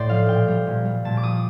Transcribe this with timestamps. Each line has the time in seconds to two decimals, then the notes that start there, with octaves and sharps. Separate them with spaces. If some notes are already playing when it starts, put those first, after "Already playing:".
Already playing: A2 C5 D5
0.09 F3 F5
0.28 A#2 G5
0.48 G3
0.67 A#2
0.85 G3
1.05 A#2 A5
1.17 D6
1.23 F3 D#6